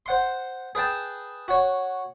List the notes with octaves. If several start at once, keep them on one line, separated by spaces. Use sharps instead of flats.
C5 F#5 C6
G#4 B4 G5 A5
F#4 C#5